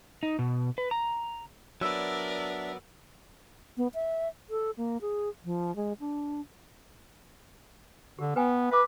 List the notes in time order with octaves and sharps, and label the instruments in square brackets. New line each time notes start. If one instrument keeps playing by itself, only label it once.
[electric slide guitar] D#4
B2
B4
A#5
[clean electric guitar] F#3 B3 [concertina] D4 E5 [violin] A#4 D5 [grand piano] E6
[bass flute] B3
E5
A4
A#3
G#4
F3
G#3
D4
[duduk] D3 [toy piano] G4
[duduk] B3 [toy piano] B4 G5 G#5
[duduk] B4 [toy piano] E5 D6